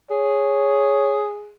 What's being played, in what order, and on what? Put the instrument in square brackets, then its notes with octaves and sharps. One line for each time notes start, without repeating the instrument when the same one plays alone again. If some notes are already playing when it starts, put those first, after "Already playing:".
[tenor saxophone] G#4 [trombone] C#5